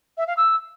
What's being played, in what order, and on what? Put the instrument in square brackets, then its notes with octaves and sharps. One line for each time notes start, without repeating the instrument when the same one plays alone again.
[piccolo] E5
F5
E6